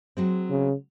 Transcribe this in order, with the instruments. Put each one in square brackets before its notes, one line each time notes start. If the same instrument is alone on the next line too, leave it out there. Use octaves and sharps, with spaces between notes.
[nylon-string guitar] F#3 G#3 C4
[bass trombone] C#3